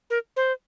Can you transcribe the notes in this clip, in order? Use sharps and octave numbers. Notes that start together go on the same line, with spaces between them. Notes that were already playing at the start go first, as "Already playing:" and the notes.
A#4
C5